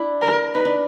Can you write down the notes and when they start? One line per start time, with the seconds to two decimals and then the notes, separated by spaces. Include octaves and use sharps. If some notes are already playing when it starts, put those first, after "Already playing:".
Already playing: D4 E4
0.22 A#4
0.54 D#4 B4
0.65 D4